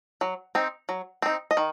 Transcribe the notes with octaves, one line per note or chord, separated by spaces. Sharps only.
F#3
C4 D#4
F#3
C4 D#4
D#5
D#3